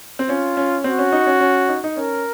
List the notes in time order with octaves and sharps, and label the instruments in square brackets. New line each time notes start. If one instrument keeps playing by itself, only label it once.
[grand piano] C4
[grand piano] C#4 [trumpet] F4
[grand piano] C#4
[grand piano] C4 [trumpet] F#4
[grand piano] C#4
D#4
C#4
C#4
D#4
D#4
[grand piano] C#4 [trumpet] A#4